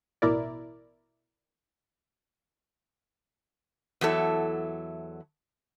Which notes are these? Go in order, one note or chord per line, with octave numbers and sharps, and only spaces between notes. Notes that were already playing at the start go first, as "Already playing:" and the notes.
A1 B2 E4 A#4 D5
E2 F#3 E4 A4